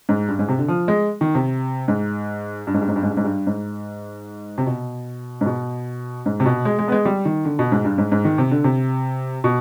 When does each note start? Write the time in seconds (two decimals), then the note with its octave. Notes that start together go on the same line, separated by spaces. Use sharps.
0.09 G#2
0.29 G2
0.39 G#2
0.48 C3
0.59 D3
0.68 F3
0.88 G#3
1.21 D#3
1.35 C3
1.88 G#2
2.67 G2
2.74 G#2
2.81 G2
2.89 G#2
2.96 G2
3.03 G#2
3.10 G2
3.17 G#2
3.24 G2
3.47 G#2
4.58 C3
4.67 B2
5.41 G#2
5.46 B2
6.26 G#2
6.40 C3
6.46 B2
6.65 G#3
6.79 G#3
6.88 B3
6.92 G#3
7.05 G3
7.25 D#3
7.45 D3
7.59 B2
7.72 G#2
7.85 G2
7.98 G#2
8.12 G#2
8.25 D#3
8.38 C3
8.51 D3
8.64 C3
9.44 B2